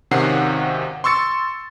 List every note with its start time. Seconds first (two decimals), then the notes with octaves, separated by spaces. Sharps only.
0.11 G#1 C3 D#3 C#4 F#5 C7
1.04 C6 C#6 E6 A6 C#7